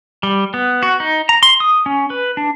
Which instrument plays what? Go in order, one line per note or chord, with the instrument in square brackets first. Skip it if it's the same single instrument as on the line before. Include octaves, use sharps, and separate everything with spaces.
[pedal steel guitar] G3
B3
F#4
D#4
A#5
C6
D#6
C#4
B4
D4